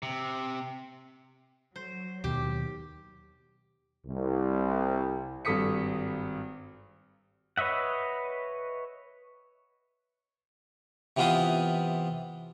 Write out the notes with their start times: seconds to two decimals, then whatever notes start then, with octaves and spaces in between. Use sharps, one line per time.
0.03 C3
1.76 F#3 C5
2.24 D#2 B2 D#3 G4
4.07 C2
5.45 G#1 G2 A4 D#6 B6 C#7
7.57 B4 C#5 D#5 E5 F#5
11.17 C3 E3 B3 F4 C5 D#6